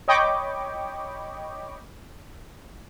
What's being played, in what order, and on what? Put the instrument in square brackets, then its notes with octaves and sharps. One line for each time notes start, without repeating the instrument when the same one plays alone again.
[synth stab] C#5 D#5 G5 B5 C#6 D6